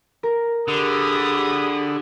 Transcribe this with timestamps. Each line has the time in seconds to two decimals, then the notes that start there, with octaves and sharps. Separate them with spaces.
0.23 A#4
0.68 D3 G4 G#4 B5 D#6